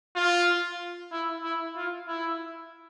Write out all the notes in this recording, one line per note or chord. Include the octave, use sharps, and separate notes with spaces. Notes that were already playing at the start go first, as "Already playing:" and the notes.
F4
E4
E4
F4
E4